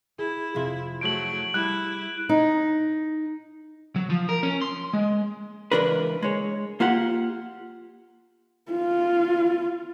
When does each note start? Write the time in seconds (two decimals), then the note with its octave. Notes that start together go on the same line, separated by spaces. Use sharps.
0.18 E4 G#4
0.55 F2 C3 F4 G#4 E5 C6
1.01 F#3 A3 D7 F#7
1.54 G3 E4 F#6
2.29 D#4
3.96 F#3
4.10 F3
4.29 A#4
4.43 C#4
4.62 C6
4.93 G#3
5.72 C#2 C#3 E3 D4 A#4 B4
6.23 G#3 C#5
6.80 A#3 F4 G4 F#5
8.72 F4